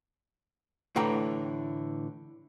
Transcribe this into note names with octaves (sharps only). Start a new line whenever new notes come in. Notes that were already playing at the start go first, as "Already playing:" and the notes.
A2 D3 E3 G5 A#5